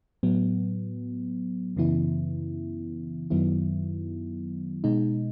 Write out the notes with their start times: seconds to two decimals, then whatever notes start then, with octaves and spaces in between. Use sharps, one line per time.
0.23 A2 F#3 B3
1.76 F#2 C#3 E3 B3 E4
3.30 F#2 D#3 F#3 B3 E4
4.84 B2 G#3 D#4